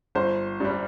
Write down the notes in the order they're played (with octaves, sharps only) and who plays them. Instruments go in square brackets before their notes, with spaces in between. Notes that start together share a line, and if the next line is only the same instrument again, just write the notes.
[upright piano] G1 C5
G2 G3